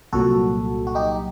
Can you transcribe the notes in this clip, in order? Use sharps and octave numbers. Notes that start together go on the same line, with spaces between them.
C2 A#2 F#3 F#4 A4
F#4
D#4 G4